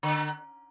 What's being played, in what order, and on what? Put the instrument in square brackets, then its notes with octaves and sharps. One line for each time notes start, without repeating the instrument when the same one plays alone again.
[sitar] D3